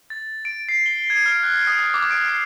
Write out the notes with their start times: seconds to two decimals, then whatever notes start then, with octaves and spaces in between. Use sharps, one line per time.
0.10 A6
0.45 D7
0.69 C7
0.86 G7
1.10 G#6
1.26 F6
1.43 F#6
1.67 D#6
1.94 D6
2.11 D7
2.28 C7